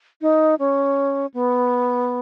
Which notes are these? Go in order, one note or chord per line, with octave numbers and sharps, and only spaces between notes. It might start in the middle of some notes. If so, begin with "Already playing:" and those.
D#4
C#4
B3